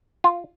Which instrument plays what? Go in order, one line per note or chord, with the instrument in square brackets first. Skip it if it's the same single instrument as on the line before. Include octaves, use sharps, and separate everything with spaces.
[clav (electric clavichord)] F4